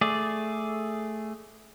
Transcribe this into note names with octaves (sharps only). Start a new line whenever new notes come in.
A3 G#4 D5